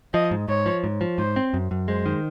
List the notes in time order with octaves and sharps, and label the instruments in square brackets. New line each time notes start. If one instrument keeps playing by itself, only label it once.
[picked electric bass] F3 [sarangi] D#5
[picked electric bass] G#2
[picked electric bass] G#2 [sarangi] C#5
[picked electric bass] F3
G#2
F3
[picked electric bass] G#2 [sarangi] C5
[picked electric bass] C4
F#2
F#2
[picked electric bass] G#3 [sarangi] C5
[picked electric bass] D#3